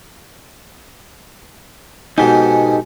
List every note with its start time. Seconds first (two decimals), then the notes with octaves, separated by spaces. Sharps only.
2.18 G#2 B2 D#4 G4 A4 G#5